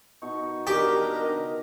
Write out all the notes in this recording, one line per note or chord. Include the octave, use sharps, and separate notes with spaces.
B2 D#4 C#6
D4 G4 A#4 D#5 A#5